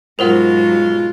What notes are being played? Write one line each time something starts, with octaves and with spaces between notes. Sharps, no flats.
G#2 B2 F#3 G#3 F4 A#4 C5 F#5